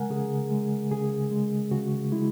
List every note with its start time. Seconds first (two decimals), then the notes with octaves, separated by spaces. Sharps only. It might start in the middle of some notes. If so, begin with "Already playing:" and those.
Already playing: C#3 G#3 A#4 F#5 G#5
0.10 C#3 G#4
0.51 G#3
0.91 C#3 G#4
1.31 G#3
1.71 C#3 F#4
2.12 G#3 E4